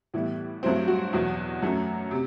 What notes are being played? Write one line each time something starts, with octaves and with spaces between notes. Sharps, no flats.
A2 E3 G3 B3 E4
G2 F#3 A3 C4 E4
F#4
E2 B2 F#3
F#2 F#3 A3
C3